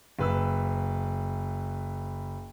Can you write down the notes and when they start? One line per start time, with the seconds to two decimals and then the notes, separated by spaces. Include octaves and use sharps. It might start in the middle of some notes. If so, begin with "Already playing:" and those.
0.19 F#1 B4 E6